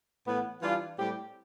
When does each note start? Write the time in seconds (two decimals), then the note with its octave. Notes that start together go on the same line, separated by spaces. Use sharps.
0.26 A2 E3 B3
0.62 E3 G3 D4 F4
0.98 A2 G3 C4 G4